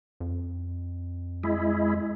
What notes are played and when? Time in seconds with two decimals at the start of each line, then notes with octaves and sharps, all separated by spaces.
0.20 F2
1.44 G#3 E4